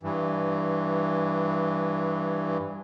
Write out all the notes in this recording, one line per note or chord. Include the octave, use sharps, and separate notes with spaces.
G2 E3